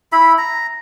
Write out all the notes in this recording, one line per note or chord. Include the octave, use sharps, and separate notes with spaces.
E4 E5 B5
A#5